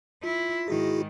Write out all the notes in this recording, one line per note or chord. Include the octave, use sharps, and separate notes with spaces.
E4 F4
G#2 D#3 E4 F#4 G#4